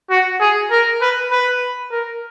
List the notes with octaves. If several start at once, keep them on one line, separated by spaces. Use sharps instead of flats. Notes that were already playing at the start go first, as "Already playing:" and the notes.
F#4
G#4
A#4
B4
B4
A#4